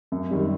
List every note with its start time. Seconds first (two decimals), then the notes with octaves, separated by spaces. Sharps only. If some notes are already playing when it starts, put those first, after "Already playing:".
0.12 F#2
0.31 D#3 G3